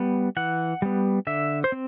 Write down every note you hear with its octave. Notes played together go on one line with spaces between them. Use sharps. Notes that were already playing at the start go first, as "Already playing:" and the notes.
Already playing: G3 B3
E3 F#5
G3 B3
D3 E5
C5
C4